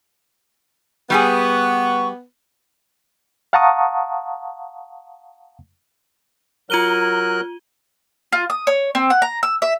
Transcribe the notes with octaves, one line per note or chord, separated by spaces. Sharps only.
G3 B3 G4 G#4 C#6
F5 F#5 A5 A#5 C#6 D#6
F#3 F4 A#4 F#6 D#7 G7
F4
D#6
C#5
C4
F#5
A#5
E6
E5